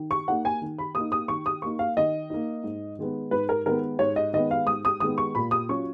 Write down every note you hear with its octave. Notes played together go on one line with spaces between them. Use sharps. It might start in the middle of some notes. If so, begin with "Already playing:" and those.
Already playing: D#3
C#6
A#3 D#4 F#5
G#5
D#3
B5
A#3 D#6
D#4
D#6
D#3 C#6
D#6
A#3 D#4 C#6
F5
D#3 D#5
A#3 D#4
G#2
D#3 G#3 B3
G#2 B4
A#4
D#3 G#3 B3 A#4
G#2 C#5
D#5
D#3 G#3 B3 D#5
F5
G#2 D#6
D#6
D#3 G#3 B3 D#6
C#6
A#2 B5
D#6
F#3 C#4 F4 C#6